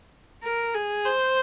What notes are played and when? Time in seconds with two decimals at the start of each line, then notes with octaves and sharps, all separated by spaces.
0.43 A#4
0.74 G#4
1.05 C5